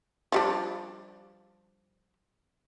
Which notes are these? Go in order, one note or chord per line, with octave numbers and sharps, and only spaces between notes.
F3 G3 D4